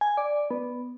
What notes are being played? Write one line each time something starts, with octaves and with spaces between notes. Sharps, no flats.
G#5
D5
B3